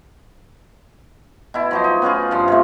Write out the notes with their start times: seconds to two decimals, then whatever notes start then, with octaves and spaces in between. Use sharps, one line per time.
1.54 B2 E4
1.71 F3 F#3 D#4
1.84 D#4
2.02 B3 C#4 F4 G#4
2.31 G2 F3
2.48 C3 F3 A3